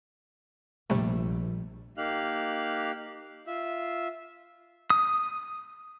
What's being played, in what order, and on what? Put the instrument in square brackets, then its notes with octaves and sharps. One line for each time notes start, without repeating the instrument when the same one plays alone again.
[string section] A#1 [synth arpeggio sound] C3 G3 A3
[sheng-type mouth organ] A#3 D#4 G4 F5 F6 F#6
F4 E5
[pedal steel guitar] D#6